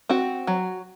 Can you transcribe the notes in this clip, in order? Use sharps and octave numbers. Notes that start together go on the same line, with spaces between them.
C4 F#4
F#3